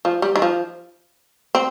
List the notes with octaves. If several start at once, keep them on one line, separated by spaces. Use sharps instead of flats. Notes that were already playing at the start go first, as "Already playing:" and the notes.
F3
G3
D#3
F3
C4